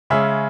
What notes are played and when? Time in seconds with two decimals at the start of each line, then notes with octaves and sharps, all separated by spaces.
0.10 C#3 G#3 C#4 E5